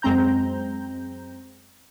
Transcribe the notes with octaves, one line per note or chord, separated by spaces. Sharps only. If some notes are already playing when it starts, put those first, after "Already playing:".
F#2 G#3 C4 A#5 G6